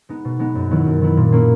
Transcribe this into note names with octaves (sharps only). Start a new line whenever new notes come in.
G#3 B3 D#4
B2
G#3 B3 D#4
F#2
D#3 F#3 B3 E4
F#2
D#3 F#3 B3 E4
A#2
A#3 C#4 E4